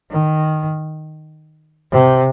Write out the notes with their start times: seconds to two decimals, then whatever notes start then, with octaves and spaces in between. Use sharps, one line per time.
0.10 D#3
1.91 C3